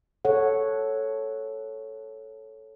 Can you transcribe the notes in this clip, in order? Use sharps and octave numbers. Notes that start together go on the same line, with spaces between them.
A4 C#5 F#5